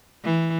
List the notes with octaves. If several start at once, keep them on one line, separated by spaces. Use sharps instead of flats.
E3